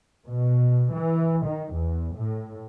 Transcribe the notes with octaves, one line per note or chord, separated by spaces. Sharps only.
B2
E3
D#3
E2
A2